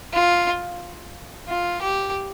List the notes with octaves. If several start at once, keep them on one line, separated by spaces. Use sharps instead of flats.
F4
F4
G4